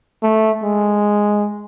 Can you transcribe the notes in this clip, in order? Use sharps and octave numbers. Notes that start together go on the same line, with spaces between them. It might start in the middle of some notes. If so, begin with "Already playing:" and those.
A3
G#3